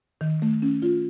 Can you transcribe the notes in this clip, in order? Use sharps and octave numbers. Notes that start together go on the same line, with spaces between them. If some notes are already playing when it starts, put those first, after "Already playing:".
D#3
A3
C#4
F4